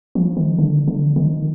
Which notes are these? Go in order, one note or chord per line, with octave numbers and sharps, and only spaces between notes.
F3
D#3
D3
D3
D#3